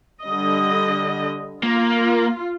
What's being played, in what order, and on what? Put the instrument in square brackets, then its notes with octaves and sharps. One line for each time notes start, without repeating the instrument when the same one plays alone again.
[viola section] D3 G3 D#5
[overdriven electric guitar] A#3 [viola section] F4